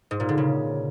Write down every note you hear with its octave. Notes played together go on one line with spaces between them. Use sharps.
G#2
A#2
D3
C#3